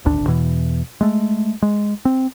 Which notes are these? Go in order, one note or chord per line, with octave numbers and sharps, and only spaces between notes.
D#1 G#1 D2 D4
E2 B2 E3
G#3 A3
G#3
C4